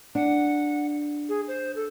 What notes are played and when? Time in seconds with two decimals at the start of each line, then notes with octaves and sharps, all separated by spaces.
0.15 D4 F#5
1.28 G#4
1.47 C5
1.76 A4